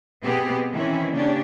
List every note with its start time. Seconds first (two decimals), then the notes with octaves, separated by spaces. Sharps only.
0.22 B2 B3 C4 G4 G#4
0.71 D#3 E3 C4 C#4 E4
1.12 C#3 A#3 C#4 D4 G4